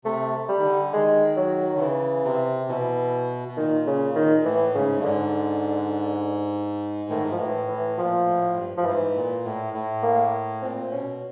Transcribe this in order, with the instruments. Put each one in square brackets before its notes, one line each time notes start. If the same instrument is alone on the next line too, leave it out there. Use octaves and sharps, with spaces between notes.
[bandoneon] C3 [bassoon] A3
[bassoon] G3
[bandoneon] D#3
D3
[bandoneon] D#3 [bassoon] G#3
[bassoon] F#3
[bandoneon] D3
[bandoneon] C#3 [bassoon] E3
[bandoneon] C3
[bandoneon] B2 [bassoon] E3
[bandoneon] B2
[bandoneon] A#2 [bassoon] D#3
[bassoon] C#3
D#3
[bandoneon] A#2
[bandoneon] A2 [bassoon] E3
[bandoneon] G#2 [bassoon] C#3
[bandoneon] G2
[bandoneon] G#2 [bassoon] D3
[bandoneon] A2 [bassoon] D#3
[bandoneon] G#2
[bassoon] F3
[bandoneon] A2 [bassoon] E3
[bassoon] E3
[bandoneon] A#2 [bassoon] F3
[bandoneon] A2
G2
[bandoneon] G2 [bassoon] F3
[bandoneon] G#2 [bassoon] E3
[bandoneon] A#2
A2
A2
[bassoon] A#3
[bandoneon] A#2 [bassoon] C4
[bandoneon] B2 [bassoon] C#4